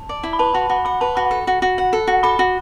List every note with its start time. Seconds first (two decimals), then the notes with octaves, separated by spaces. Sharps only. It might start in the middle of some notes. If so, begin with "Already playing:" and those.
Already playing: A5
0.09 D5
0.23 E4
0.33 B5
0.39 B4 A5
0.54 F#4 A5
0.69 F#4 B5
0.85 F#5 B5
1.01 B4 A5
1.15 F#4 B5
1.31 A4
1.47 F#4
1.62 F#4
1.78 F#5
1.93 A4
2.07 F#4
2.23 A4 B5
2.39 F#4